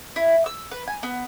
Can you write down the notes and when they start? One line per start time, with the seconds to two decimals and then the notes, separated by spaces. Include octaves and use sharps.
0.16 E4
0.46 E6
0.71 B4
0.88 G#5
1.03 B3